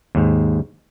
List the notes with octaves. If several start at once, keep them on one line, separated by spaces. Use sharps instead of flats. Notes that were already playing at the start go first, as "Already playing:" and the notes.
D#2 G#2